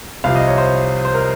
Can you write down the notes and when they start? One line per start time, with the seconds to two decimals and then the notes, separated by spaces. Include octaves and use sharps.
0.24 C2 C3 F3 F5
0.36 D#5
0.47 C#5
0.58 C5
1.05 C5
1.14 A#4